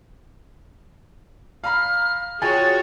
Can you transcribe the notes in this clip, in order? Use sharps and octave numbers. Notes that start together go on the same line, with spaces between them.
F5 A#5 B5 F6
F4 F#4 G#4 C#5 G5 G#5 A6